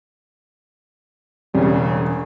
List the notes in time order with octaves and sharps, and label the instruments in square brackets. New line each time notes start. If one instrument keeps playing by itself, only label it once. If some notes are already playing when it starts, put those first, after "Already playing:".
[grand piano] E1 [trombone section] C#3 [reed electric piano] G3 G#5 [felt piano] C#4